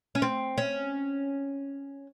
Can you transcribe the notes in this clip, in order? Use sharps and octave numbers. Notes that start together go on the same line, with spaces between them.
C#4
C4
C#4